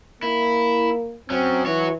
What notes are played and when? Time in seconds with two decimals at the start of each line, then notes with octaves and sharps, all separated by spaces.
0.23 A#3 E4
1.30 F#3 C4 C#4
1.66 E3 F#4 C#5